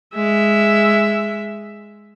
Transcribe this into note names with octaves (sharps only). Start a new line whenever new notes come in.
G#3 E5